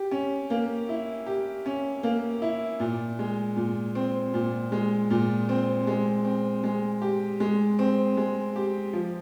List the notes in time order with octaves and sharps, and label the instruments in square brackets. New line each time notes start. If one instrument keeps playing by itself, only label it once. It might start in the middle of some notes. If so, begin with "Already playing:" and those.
Already playing: [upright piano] G4
C#4
A#3
E4
G4
C#4
A#3
E4
A#2
G#3
A#2
C4
A#2
G#3
A#2
C4
G#3
C4
G#3
G4
G#3
C4
G#3
G4
F3